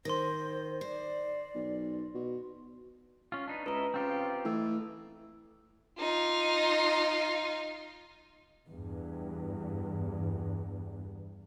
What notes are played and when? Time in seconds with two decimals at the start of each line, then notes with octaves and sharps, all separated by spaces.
0.05 D#3 C5 C6 A#6
0.81 C5 D5
1.55 B1
2.14 B2
3.32 C#4 F4
3.48 D4 D#4 B4
3.66 C#2 E4 B4 D#5 A#5
3.94 C#3 C4 F4 G4
4.45 E3 A3 A4 E6
5.99 D#4 F4
8.68 E2 G2